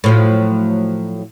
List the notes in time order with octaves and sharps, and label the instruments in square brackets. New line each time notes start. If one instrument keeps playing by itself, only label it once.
[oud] A2 F3 F#3